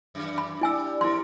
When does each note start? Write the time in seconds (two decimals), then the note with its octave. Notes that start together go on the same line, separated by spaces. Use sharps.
0.15 F#2 E3
0.38 B5
0.61 G3 D4 E4 G#5 E6
1.01 F2 G#2 E4 A#4 C6